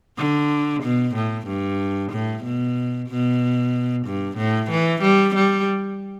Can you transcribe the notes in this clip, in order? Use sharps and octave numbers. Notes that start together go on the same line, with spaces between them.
D3
B2
A2
G2
A2
B2
B2
G2
A2
E3
G3
G3